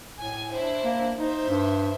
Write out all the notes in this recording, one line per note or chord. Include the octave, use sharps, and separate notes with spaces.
A2 G#5
D4 E4 C5
A#3
D#4 C5 E5
G2